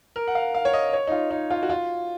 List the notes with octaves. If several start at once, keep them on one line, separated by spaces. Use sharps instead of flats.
A#4
F#5
F5
F5
C#5
D#5
C#5
D#4
F4
D#4
F4
F#4
F4